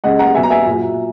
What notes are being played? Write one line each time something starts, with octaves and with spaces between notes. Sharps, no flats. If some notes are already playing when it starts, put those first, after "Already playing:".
C#3 G#3 D#5 F#5
F#5 A#5
B2 F#3 E5 G#5
A#5
E5 G#5
A#2 F#3